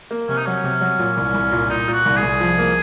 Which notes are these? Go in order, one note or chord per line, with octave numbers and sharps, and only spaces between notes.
A#3
C3 C#4
D#4
F#3 C#4
C3
F#3
A#2
C2
C2
A#2
A#2 D#4
A#2
F#4
C2
G#4
C2
F3
A#3